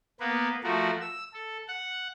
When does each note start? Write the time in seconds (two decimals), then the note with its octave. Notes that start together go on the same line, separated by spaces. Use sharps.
0.20 A#3 B3 B4
0.63 F3 A3 F#4 A#4
1.01 E6
1.33 A4
1.68 F#5